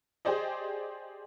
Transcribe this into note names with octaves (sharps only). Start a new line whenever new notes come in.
G4 G#4 C5 D5 D#5